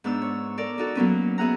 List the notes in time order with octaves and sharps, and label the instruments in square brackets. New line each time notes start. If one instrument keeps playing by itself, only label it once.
[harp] G#2 B3 D4 E6
C#5
A4 A#4 D5
D#4 F#4 A4
F#3 A#3 B3 C#4
B3 G#4 E5 F#5 A#5